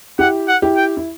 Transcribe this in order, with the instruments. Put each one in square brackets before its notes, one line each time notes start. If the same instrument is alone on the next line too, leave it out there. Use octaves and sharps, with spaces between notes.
[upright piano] E4 G4 [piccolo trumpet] F#5
[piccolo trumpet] F#5
[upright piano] E4 G4
[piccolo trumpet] G5
[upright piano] E4